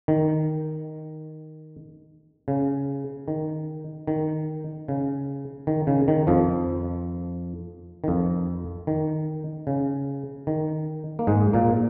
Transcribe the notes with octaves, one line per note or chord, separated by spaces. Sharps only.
D#3
C#3
D#3
D#3
C#3
D#3
C#3
D#3
F2 F3
D#3
F2 F3
D#3
C#3
D#3
A#3
G#2 G#3
A#2 A#3